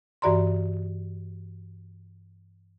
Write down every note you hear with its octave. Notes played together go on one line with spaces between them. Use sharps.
G2 E3 F#4 D5 A#5 C6